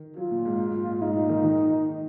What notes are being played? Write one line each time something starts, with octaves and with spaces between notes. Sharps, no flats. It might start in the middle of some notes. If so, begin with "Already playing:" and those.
Already playing: D#3
F#3 F4
A#2
G#2
G#2
A#2
G#2
G#2 D#4
A#2
D#3
D#3